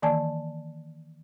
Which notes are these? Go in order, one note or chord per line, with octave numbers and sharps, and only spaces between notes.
D#3 E3 A#3 D5 G#5 A5